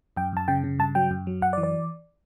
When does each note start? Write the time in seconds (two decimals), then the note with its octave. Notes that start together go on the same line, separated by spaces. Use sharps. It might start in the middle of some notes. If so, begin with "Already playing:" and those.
0.17 F#2 G5
0.33 F#2 A5
0.48 C#3 G5
0.64 C#3
0.79 G2 A5
0.95 F#3 G5
1.11 F#2
1.27 F#3
1.42 F#2 F#5
1.53 D5
1.57 E3
1.63 D5